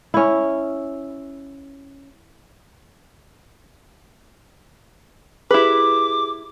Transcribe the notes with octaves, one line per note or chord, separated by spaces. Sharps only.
C#4 E4
E4 G4 G#4 B4 D6